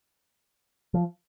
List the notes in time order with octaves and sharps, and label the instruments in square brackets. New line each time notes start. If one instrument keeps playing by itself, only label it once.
[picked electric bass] F3